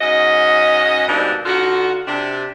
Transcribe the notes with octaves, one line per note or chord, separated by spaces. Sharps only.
G#2 C#4 F#4 D#5
G2 B2 A#3 C4 D4 D#4
D3 D#4 F4 F#4
C3 D4